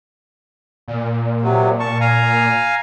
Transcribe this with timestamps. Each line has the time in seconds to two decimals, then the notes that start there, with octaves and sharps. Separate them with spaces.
0.88 A#2
1.42 C3 F#3
1.80 A5 C#6
2.00 F5 G#5 A#5